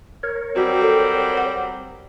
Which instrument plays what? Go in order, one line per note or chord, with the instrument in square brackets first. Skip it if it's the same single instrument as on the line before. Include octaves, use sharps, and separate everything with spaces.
[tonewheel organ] A#4 C#5
[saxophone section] F#3 G3 C4 [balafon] F#4
[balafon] A4
F#5